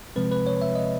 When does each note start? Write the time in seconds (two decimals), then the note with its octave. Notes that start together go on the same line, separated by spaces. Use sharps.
0.16 C3 F3 G#3 C4 B4
0.31 B4
0.47 C#5
0.62 E5
0.75 D#5